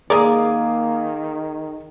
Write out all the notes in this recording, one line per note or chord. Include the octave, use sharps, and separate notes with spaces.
D#3 G#3 A#3 G#4 A#4 D5 D6 D#6